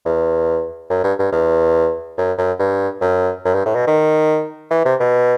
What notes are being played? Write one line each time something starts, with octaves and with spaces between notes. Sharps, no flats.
E2
F#2
G2
G2
E2
F#2
F#2
G2
F#2
F#2
G2
A2
B2
D#3
E3
C3
B2